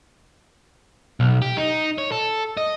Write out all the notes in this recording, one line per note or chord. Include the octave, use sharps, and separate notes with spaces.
B1
G4
D#4
C#5
A4
D#5